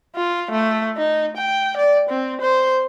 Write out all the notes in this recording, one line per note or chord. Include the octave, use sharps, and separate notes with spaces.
F4
A3
D#4
G5
D5
C4
C5